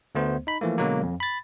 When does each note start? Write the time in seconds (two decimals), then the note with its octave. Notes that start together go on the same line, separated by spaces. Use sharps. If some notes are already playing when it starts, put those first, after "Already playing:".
0.15 D2 A3 B3 C5
0.47 D#4 B5
0.61 E3 F3 A3 A#3
0.78 B2 D3 F#3 G#3 A#3
1.03 F2
1.20 B5 A6